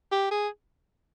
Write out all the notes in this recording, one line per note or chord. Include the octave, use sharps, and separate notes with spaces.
G4
G#4